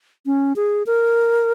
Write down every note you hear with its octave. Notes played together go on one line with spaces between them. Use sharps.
C#4
G#4
A#4